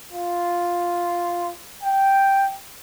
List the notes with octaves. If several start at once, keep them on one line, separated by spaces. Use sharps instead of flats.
F4
G5